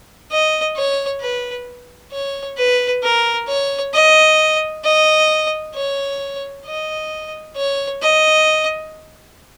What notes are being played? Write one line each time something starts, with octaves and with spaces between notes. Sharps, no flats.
D#5
C#5
B4
C#5
B4
A#4
C#5
D#5
D#5
C#5
D#5
C#5
D#5